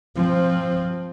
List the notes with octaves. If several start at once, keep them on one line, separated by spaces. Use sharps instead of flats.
F3 C4